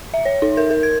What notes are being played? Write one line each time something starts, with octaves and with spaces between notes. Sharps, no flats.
E5
C#5
D#4
A#4
A#4
G#6